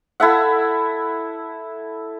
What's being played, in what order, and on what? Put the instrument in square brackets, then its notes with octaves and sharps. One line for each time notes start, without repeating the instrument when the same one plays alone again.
[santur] E4 A4 E5 F#5